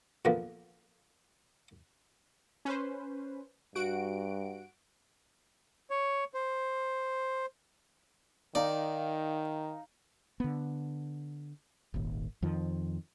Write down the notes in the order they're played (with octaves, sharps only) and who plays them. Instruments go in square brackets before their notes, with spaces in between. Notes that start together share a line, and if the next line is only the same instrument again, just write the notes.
[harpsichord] A#2 D3 F3 A#3 B3
[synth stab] C#4 B4 C5
[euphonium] G2 [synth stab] F#4 F#5 D7
[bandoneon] C#5
C5
[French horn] D#3 [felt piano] D#4 F5 A#5 [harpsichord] D5
[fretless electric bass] D3 B3
D#1 G#1 D#2
F2 D#3 F3